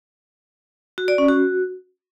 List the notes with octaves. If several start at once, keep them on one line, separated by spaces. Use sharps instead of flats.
F#4
D5
C#4
F#4